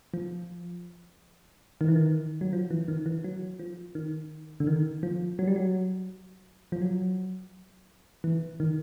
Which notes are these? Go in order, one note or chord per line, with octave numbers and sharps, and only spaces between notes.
F3
D#3
E3
D#3
F#3
F3
E3
D#3
E3
F#3
F3
D#3
D3
D#3
F3
F#3
G3
F#3
F3
F#3
E3
D#3